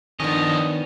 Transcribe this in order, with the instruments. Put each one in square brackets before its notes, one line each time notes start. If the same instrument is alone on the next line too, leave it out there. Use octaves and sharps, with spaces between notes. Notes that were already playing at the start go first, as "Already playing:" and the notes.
[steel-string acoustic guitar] D#3 D4 [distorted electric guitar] F3 D#5 [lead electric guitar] B3 C#4